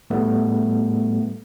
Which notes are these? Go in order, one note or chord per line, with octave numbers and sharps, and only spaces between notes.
A2 G3 A3 B3